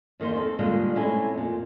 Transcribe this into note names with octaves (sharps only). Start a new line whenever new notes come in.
E2 D#3 A#3 D#4 C5
D#3 C4 A4
A#2 D3 D#3 G3 G#3 A#3
A2 C3 G#3 A3 C#4 E4
F2 A#2